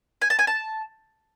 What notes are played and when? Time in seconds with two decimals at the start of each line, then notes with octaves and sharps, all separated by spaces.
0.22 G#5
0.30 A5
0.39 G#5
0.47 A5